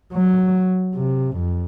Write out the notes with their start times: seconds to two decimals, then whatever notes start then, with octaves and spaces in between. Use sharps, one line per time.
0.13 F#3
0.95 C3
1.37 F2